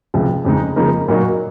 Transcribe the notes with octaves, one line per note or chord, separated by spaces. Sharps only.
C#2 C3 F3
F2 C#3 G#3 D#4
C#3 F3 A#3 D#4 A#4
A#2 F#3 A#3 D#4 F#4